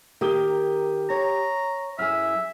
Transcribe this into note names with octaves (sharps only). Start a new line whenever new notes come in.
D#3 A#3 G4 A#4 D#6 G7
C#5 A#5
F#2 E4 G#4 E5 F6